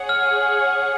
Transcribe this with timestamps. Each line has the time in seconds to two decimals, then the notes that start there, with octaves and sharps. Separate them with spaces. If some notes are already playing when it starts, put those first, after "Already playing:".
Already playing: G#4 C#5 F#5
0.09 F6